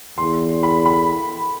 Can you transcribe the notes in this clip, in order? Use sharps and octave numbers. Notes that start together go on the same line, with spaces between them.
E2 C6
B5
B5